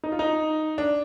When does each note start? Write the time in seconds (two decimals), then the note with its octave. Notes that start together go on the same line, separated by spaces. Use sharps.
0.04 D#4
0.12 F4
0.19 D#4
0.78 D4